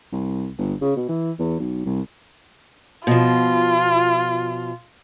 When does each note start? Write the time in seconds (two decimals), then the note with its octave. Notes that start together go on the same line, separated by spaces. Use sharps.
0.12 C2
0.58 G1
0.81 C#3
0.96 B2
1.09 E3
1.39 E2
1.60 B1
1.86 C2
3.07 B2 F3 F4